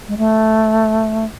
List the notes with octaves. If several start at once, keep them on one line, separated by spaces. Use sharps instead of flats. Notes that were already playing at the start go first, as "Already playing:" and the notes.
G#3
A3